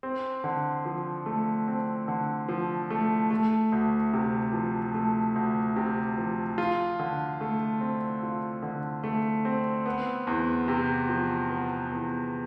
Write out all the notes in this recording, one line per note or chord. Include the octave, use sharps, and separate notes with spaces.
C4
D3
F3
A3
C4
D3
F3
A3
A3
D2
C3
F3
A3
D2
C3
F3
F4
D3
A3
C4
F4
D3
A3
C4
B3
E2
C3
F3
B3
E2